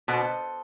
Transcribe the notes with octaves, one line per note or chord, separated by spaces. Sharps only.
B2 A4 C5